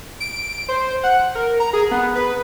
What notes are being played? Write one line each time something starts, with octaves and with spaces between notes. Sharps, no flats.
D7
C5
F#5
A#4
A#5
G#4
B3
B4